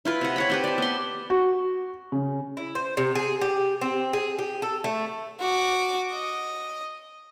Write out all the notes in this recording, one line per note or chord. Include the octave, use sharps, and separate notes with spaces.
E4 F4 B4
C3 F#5
C#5 F#5 B5
C4 G4 B4
D5 A5
B3 C6
F#4
C#3
E4
C5
C3
G#4
G4
C4
G#4
G4
A4
A3
F#4 D6
D#5